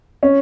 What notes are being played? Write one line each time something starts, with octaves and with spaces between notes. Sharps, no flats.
C#4